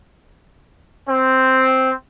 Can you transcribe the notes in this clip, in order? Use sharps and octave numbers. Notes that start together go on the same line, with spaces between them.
C4